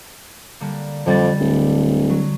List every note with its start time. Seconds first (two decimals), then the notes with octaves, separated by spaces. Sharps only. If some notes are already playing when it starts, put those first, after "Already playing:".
0.60 D3 G3 A#3
1.06 F2 D3 G3 A6
1.40 D1
2.09 F#3